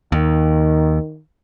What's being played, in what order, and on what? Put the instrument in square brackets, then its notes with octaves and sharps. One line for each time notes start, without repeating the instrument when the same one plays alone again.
[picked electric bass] D#2 [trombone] D#3